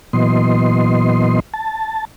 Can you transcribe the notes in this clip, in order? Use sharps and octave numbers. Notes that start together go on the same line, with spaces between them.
A#2 E3 F#3 B3 D#5 C6
A5